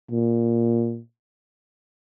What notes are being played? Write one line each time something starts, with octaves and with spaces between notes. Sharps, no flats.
A#2